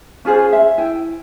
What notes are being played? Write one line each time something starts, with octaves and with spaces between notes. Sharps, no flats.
C#4 F4 G#4 C5
E5
E4 G5